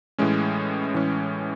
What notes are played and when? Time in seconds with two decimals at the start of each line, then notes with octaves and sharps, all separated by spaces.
0.18 A2 E3 G#3 C#4
0.94 A2 E3 G#3 C#4